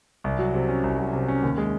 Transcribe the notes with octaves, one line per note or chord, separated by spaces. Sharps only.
C2
F#3
C3
C#4
C2
F#3
C3
C#4
D#2
G#3